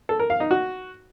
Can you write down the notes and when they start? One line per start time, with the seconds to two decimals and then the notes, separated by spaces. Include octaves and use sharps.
0.09 A4
0.19 A#4
0.30 F5
0.40 D#4
0.51 F#4